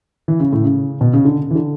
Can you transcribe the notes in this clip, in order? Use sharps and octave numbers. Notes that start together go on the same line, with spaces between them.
E3
C#3
A2
C#3
B2
C#3
D3
E3
D3